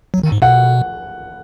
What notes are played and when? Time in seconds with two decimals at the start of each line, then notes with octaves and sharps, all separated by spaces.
0.14 F#3
0.23 D#3
0.32 G#2
0.42 B2 F#5